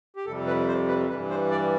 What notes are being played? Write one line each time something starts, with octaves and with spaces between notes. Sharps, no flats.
G4
F2 C3 G3 A4
B4
C5
B4
G2 E3 G3 B4
C5
D5